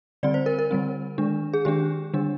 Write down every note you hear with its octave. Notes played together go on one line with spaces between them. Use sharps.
D3 G3 C4 D5
C5
A#4
A#4
D3 G3 C4
D#3 G#3 D4
G#4
D#3 G#3 D4 G4
D3 G3 D4